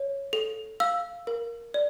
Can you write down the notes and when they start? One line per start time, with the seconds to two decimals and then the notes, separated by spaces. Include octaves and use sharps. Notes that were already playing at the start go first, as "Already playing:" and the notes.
Already playing: C#5
0.33 A4
0.80 F5 E6
1.27 A#4
1.74 D5